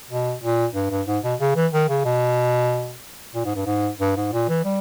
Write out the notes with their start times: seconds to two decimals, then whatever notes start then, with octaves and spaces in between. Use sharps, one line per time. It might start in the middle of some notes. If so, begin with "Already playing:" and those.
0.11 B2
0.43 A#2
0.75 G2
0.91 G2
1.07 G#2
1.24 B2
1.40 C#3
1.56 E3
1.73 D#3
1.89 C#3
2.05 B2
3.35 A#2
3.45 G#2
3.55 G2
3.66 G#2
4.00 G2
4.17 G#2
4.33 A#2
4.49 E3
4.64 G3